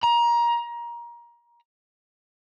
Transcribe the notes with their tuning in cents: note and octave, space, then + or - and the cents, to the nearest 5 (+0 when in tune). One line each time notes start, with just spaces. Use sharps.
A#5 +25